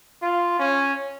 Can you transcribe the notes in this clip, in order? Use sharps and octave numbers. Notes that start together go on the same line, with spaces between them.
F4
C#4